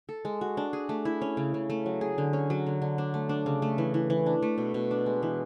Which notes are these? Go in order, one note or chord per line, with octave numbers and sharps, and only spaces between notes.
A4
G#3
F#4
D4
G#4
A3
E4
C#4
C#3
C#3
A3
F#3
G#4
D3
C#4
F#3
D3
D3
D4
A3
D4
C#3
A3
E3
E3
E3
D4
A3
B2
B2
D4
G#3
E3